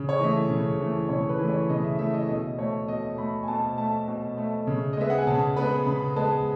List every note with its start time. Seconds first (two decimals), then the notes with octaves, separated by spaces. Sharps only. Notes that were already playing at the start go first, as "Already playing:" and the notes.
Already playing: C#3
0.09 C#5
0.20 E3 A3 D#5
0.49 C#3
0.79 E3 A3
1.09 C#3 C#5
1.29 B4
1.39 E3 A3
1.49 C#5
1.69 C#3 D#5
1.84 E5
1.99 E3 A3 E5
2.14 D#5
2.28 B2 D#5
2.58 A3 C#5
2.88 B2 D#5
3.18 A3 B5
3.43 G#5
3.48 B2 A5
3.78 A3 A5
4.08 B2
4.38 A3
4.67 C#3
4.93 D#5
4.97 G#3 B3 E5
5.10 F#5
5.18 G#5
5.27 C#3 A5
5.56 G#3 B3 B5
5.86 C#3 B5
6.16 G#3 B3 A5